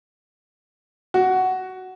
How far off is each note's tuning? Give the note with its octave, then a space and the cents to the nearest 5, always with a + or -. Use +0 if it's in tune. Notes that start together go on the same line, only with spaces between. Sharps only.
F#4 +10